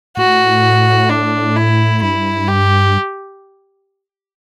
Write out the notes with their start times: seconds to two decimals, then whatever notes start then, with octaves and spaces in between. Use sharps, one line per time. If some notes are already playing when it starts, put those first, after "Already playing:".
0.17 A2 F#4
1.10 D4
1.56 E4
2.02 G2 E4
2.48 G4